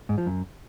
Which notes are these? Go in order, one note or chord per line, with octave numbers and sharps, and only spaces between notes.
G#2
F3
F#2